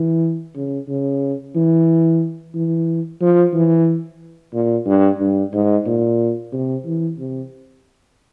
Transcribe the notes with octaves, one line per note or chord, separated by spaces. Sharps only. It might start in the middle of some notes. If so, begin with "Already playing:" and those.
Already playing: E3
C#3
C#3
E3
E3
F3
E3
A#2
G2
G2
G#2
A#2
C3
E3
C3